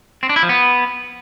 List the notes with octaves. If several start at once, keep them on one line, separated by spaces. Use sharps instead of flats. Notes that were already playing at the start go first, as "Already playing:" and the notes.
C4
D4
E4
F3
B3